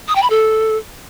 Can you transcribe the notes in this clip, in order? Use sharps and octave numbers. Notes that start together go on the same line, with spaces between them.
D#6
G5
B5
A4